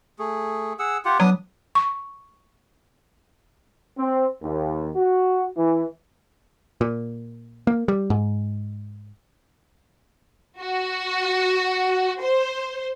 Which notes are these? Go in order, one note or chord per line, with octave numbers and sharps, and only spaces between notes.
A3 G#4
G#4 F#5 E6
F4 G4 F#5
F#3 B3 D4 D#6
C#6
C4
D#2
F#4
E3
A#2
A#3
G3
G#2
F#4
C5